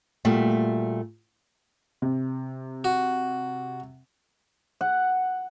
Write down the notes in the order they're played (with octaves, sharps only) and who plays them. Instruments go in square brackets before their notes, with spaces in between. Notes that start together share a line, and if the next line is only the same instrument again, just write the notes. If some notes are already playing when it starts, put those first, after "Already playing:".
[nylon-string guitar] A#2 G3 A3 F#4
[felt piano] C3
[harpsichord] F#4
[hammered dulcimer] F#5